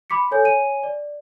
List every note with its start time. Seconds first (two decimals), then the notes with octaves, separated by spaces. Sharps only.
0.10 B5 C6 D6 B6 C#7
0.31 A4 C#5 G#5 G6
0.44 C#5 G#5 D#7
0.83 D5